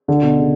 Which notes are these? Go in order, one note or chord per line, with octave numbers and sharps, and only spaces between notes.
D2 D3
B2
C#3